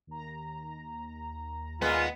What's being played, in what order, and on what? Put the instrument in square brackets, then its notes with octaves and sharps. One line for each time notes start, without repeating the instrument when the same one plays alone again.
[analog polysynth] D#2 A#5
[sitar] A#2 G#3 B4 [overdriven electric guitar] B3 [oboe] F4